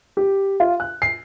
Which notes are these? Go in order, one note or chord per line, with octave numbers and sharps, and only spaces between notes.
G4
F4
F#6
C7